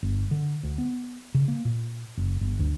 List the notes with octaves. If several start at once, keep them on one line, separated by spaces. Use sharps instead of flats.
G1
D3
D2
B3
C#3
A#3
A#2
F#1
G1
D2